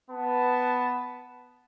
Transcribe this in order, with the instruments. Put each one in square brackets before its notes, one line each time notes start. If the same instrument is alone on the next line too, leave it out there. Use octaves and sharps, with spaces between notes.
[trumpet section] B3 B4 A5